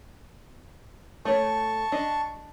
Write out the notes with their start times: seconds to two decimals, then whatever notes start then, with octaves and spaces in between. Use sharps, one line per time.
1.25 A3 C#5 A5 C#6
1.92 D4 D#5